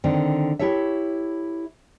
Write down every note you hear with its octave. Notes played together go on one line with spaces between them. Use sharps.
D3 D#3 C4
E4 G4 A4 C#5 E5